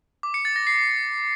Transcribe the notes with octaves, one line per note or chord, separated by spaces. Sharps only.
D6
C#7
A6
A#6
C7